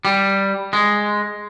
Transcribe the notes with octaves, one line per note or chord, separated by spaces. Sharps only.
G3
G#3